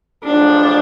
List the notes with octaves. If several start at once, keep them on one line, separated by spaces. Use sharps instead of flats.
A1 G#2 F3 D4